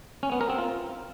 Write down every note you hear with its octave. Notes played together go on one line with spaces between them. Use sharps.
C#4
B3
A#4
C4
F4